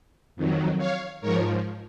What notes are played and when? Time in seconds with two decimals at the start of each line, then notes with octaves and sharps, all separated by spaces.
0.36 F2 D#3 F#3
0.78 C#5 F5
1.21 G#2 F3 A#4 C#5